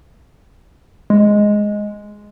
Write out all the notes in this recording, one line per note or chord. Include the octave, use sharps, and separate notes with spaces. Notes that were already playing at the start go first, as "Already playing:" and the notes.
G#3